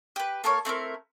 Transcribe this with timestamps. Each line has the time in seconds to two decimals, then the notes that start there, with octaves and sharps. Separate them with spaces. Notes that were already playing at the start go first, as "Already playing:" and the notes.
0.16 G4 B4
0.44 A#3 A4 A#4 C#5
0.65 A3 C4 E4 A#4